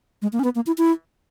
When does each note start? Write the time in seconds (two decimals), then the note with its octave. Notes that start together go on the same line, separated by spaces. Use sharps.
0.22 G#3
0.33 A#3
0.39 C#4
0.44 B3
0.55 A#3
0.67 E4
0.78 E4